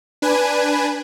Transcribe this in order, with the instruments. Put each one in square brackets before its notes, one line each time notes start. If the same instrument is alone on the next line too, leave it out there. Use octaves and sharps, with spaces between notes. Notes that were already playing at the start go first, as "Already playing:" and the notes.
[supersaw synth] D4 B4 G#5